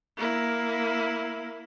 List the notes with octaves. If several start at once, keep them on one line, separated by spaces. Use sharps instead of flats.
A#3 E4